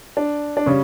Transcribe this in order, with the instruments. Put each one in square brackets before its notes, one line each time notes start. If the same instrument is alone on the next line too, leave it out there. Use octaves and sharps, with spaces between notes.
[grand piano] D4
D4
[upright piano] C#3 G3 [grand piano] C#4